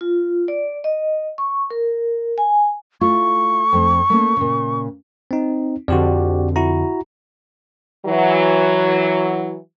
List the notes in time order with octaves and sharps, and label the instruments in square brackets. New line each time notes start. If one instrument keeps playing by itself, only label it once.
[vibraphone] F4
D5
D#5
C#6
A#4
G#5
[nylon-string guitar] A3 E4 F4 [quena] C#6
[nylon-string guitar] F2 A3 C4
A3 A#3 C#4
A#2 C#3
[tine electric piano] C4 D#4
[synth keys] F2 D3 [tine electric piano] F#4 G4 D5
[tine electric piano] E4 F#4 A#5
[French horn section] E3 F#3